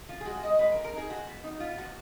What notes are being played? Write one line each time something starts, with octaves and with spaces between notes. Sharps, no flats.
F3 F4
G#4
G#3 F#4
G#3 D#5
G#3 B4
A#4
F3
A#4
D#4 G#4
F3 F#4
B3
D#4
B3 F4
F3 F#4